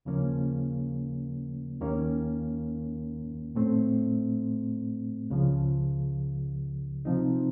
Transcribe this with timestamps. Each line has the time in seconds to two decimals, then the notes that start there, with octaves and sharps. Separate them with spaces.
0.05 D#2 C#3 F3 A#3 C#4
1.81 D#2 D#3 A#3 C#4
3.55 A2 A3 C4
5.30 C#2 C#3 F3
7.05 C3 F3 C4 D#4